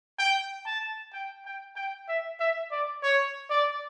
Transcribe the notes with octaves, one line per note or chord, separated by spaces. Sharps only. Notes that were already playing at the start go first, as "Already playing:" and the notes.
G5
A5
G5
G5
G5
E5
E5
D5
C#5
D5